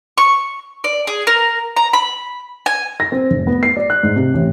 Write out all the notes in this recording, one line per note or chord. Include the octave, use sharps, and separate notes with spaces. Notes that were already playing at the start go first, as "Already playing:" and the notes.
C#6
D5
G#4
A#4
A#5
B5
G#5
A#6
C4
F1
B3
C7
D5
F#6
G#2
C3
A1